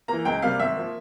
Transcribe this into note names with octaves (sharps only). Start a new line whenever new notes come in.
E3 A#3 A#5
C#2 G5
C3 G3 A#3 F5
G#1 E5
F3 A#3